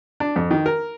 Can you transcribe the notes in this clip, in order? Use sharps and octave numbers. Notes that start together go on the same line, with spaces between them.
D4
F2
D#3
A#4